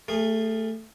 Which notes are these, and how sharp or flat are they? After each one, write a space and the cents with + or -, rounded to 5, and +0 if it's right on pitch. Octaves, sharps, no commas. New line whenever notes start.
A3 +10 G#4 -25 F5 +0